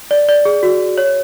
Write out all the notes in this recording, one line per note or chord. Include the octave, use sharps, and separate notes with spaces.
D5
D5
G#4
F#4
C#5